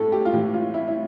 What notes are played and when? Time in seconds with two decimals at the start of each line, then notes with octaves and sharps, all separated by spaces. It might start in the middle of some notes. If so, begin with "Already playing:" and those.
Already playing: A2 A4
0.12 G4
0.25 F4
0.33 A2 E3 G4
0.54 F4
0.74 E4
0.88 E4